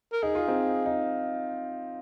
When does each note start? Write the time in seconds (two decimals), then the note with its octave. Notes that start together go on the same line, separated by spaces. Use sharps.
0.12 A#4
0.23 D#4 G#4
0.35 F4
0.48 C4 D#4
0.86 D#4